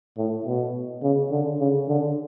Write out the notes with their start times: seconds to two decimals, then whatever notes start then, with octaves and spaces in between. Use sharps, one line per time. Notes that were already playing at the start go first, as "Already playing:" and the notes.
0.18 A2
0.46 B2
1.03 C#3
1.31 D3
1.60 C#3
1.88 D3